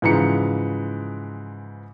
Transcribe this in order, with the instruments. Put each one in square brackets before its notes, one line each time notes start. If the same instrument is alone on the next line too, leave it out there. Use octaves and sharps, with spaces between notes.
[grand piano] G#2 C#3 E3 F3 A#5 C#7